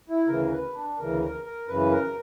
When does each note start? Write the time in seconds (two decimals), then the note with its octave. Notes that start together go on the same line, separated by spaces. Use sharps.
0.10 E4
0.27 D2 C#3 E3 A#4
0.51 B4
0.74 D4
0.98 D2 C#3 E3 A#4
1.22 A#4
1.45 A#4
1.68 F#2 C#3 E3 B4
1.91 A#4